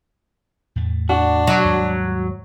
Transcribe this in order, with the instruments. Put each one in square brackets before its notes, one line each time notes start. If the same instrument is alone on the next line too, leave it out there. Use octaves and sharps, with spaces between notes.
[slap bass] E2 A2 A3
[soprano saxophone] D4 [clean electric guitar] F#4
[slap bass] B2 [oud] F#3
[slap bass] D#2 G#2 G3